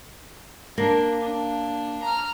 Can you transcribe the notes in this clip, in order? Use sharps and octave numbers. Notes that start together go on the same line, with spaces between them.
A#3 D4
D4
A#5 F6